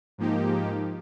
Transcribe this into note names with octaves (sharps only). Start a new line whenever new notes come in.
G#2 F3 A#3 D#4 G4